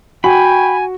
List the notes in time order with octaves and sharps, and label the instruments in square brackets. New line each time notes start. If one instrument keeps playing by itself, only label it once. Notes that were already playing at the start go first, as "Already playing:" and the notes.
[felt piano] F#4 [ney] G5 [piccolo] G#5 [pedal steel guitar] B5